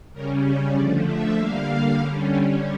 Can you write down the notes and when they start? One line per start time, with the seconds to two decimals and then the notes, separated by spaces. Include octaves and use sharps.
0.13 C#3 G3 C#4 A#4
0.74 D3 F3 A3 D5
1.05 E5
1.35 D3 G3 A#3 F5
1.97 D3 G3 C#4